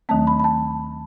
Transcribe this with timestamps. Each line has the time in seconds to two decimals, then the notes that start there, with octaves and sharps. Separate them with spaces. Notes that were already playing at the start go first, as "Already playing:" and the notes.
0.09 D#2 D#3 F#3 A3 C4 A5
0.27 B5
0.40 B5
0.44 A5